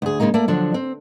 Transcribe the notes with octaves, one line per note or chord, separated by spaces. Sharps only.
D2 G#4
C#3 E3 G#3 A#3 D#4
A3 A#3 D5
D3 F3 F#3 D4
C4